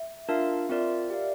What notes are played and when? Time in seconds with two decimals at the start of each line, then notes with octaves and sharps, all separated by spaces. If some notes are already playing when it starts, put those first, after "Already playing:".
Already playing: E5
0.28 D4 F4 A#4 E5 F5 A5
0.69 C4 F4 A#4 D5
1.10 G4 A#4 D5 F5